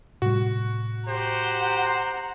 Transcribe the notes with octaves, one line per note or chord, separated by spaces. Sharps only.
A2 C3 G3 F#4
G4 C5 F#5 A#5